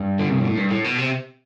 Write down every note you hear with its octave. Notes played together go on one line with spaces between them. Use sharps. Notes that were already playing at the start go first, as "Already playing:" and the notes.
Already playing: G2
D3
C3
B2
A2
G2
A2
B2
C3